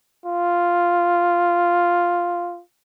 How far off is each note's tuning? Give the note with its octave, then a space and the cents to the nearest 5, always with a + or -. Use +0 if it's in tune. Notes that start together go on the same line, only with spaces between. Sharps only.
F4 +0